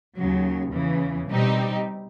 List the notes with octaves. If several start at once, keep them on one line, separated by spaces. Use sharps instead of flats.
D#2 C#3 F#3
E2 C#3 E3
B2 G3 C4 D#4 G4